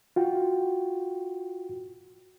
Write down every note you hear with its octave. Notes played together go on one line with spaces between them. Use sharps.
F4 F#4 G5